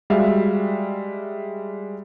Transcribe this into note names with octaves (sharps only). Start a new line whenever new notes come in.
G3 G#3 F#4 E5 F5